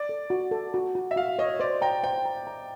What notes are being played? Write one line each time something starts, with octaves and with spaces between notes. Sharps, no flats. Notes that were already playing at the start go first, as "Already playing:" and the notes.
Already playing: D5
A4
F#4
A4
F#4
F#4
E5
F#4 F5
C#5 D#5
C5 D5
G5 A#5
C5 G5
A#5
A#5